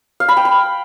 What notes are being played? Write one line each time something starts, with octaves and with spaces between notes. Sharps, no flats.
F5
B5
G5
B5